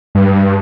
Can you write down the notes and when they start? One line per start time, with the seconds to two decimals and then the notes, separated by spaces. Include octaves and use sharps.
0.15 G2